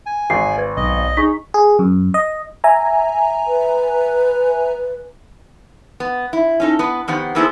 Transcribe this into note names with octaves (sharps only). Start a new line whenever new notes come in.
G#5
G#1 C7
B4 G#6
B1 D#5
D#4 G#4 C#6 B6
G#4
F#2
D#5
E5 G#5 A#5
B4
B3
E4
C#4 D#4 A4
B3 B4
F2 D#3 B3 G4 C5 F#5
A#3 B3 E4 G#4 A4 C5